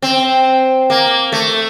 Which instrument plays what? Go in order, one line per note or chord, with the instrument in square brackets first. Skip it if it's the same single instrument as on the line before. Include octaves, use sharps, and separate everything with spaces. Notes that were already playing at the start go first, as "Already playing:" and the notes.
[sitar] C4
A#3
A3